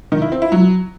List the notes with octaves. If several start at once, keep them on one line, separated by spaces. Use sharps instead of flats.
D#3
E4
C4
E4
F#3